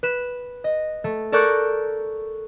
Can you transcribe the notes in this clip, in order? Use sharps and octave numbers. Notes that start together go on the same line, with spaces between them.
B4 E7
D#5
A3
A4 A#4 D5 C#6 F#6 G6